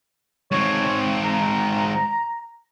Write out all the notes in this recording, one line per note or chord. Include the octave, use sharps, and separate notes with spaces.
G#2 C4 C#5
A#5